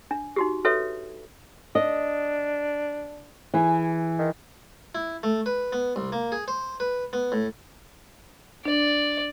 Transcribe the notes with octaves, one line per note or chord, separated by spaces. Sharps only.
D4
D#4 F#4 G4
F#4 A4 B4 C#5 E5
D4 D#5
E3 G#4
D#3
E4
A3
B4
B3
C2
A#3
G#4
C5
B4
B3
A2
D4 D5